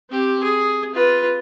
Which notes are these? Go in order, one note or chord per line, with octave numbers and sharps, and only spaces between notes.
C4 G4
G#4
F4 B4